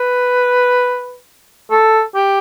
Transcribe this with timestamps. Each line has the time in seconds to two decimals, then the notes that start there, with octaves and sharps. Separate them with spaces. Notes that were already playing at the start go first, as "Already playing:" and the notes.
Already playing: B4
1.71 A4
2.15 G4